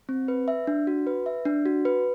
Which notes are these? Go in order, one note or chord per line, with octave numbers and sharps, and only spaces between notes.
C4
B4
E5
D4
F#4
B4
E5
D4
F#4
B4